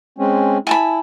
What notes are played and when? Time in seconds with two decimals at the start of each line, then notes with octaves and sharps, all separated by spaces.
0.18 G#3 C4 C#4
0.67 E4 G#5 A5 B5